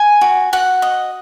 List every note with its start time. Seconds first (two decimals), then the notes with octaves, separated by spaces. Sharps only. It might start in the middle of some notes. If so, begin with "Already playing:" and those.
Already playing: G#5
0.21 F#4
0.53 F#4 F#5
0.82 D#5